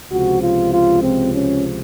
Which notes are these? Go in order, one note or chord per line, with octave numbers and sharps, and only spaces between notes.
C#2 C3 F3 F#4
F4
F4
C4
C#4